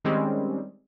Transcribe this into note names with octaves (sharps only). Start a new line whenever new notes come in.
D#3 G3 G#3 C4 C#4